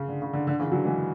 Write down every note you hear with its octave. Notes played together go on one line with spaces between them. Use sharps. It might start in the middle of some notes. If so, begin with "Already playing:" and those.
Already playing: C#3
D3
C#3
D3
D3
C#3 E3
D3 F#3
E3 G#3